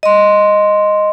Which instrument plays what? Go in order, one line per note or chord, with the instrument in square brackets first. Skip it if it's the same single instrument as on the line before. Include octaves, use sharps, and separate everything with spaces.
[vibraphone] D#5 C6